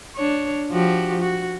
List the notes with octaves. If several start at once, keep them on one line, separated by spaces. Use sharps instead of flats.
D4 C#5
F3 F#4 G4
F#4